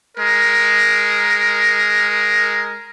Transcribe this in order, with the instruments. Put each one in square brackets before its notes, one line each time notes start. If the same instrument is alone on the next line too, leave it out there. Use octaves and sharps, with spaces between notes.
[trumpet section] G#3 A#4